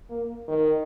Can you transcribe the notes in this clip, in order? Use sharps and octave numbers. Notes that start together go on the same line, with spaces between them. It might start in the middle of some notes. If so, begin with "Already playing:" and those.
A#3
D#3